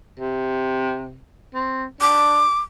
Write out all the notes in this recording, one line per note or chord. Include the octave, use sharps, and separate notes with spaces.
C3
C4
D4 D6